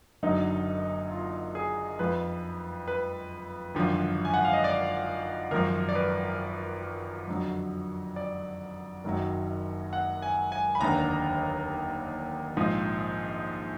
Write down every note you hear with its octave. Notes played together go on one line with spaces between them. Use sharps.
F#1 F#2 D3 F#3 D#4
F4
G#4
F2 F3 B4
B4
G#1 F#2 D3 F3
G#5
F#5
F5
D#5
D5
G#1 F#2 F3 A#4
D5
B4
F2 D3 F#3
D5
F#1 F#2 D#3 F#3
F#5
G#5
G#5
B5
F1 D#2 D3 A#5
A#1 G#2 F3